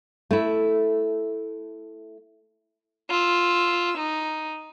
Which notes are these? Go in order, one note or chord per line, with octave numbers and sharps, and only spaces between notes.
A3 E4
F4 E6
D#4